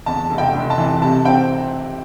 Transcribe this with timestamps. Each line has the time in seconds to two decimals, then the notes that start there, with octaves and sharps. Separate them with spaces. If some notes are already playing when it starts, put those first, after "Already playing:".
0.06 E2 A5
0.30 F1
0.38 G5
0.55 F1
0.70 A5
0.78 E3
1.02 C3 A5
1.25 C4 G5